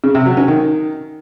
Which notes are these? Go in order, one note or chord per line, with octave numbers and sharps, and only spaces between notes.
C#3
C3
F#3
C#4
D#3